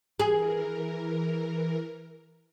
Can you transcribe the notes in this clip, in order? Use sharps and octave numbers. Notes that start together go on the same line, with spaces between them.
E3 G#4 A#4